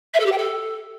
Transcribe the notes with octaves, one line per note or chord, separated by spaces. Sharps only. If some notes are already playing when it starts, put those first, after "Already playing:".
E5
A4
G4
G5
A4